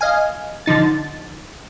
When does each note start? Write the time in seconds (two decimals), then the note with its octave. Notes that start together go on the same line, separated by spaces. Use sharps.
0.01 D#5 F5 G#5
0.66 D3 F3 D#4 A6